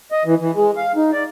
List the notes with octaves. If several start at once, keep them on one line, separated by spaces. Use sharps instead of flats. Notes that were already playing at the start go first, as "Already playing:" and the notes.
D#5
E3
E3
G#3
F5
D#4
D5